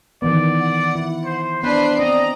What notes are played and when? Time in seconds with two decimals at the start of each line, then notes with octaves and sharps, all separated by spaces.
0.22 D#3 E3 B3 D5
0.58 F#5
0.95 E4
1.25 C5
1.63 B3 D4 B4 C5 C7
1.99 C4 D5 D#5 A#5